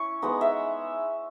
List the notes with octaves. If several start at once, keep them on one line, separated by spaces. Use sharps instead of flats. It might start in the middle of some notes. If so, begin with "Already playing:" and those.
Already playing: C#4 E4 C#6
G#3 B3 D#4 F#5
E5